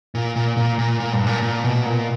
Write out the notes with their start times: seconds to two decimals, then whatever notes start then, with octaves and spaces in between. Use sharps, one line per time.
0.15 A#2
0.36 A#2
0.57 A#2
0.79 A#2
1.00 A#2
1.13 G2
1.26 A#2
1.43 A#2
1.64 B2
1.86 A#2